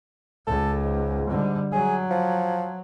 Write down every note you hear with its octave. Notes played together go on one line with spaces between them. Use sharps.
C#2 A4
G#2
D3 G3
F#3 G#4
F3